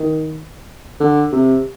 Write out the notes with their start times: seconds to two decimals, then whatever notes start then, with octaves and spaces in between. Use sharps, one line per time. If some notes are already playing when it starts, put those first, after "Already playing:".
Already playing: D#3
1.00 D3
1.32 C3